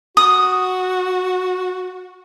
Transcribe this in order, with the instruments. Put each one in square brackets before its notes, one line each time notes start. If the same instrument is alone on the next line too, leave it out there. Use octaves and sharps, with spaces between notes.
[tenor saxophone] F#4 [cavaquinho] D#6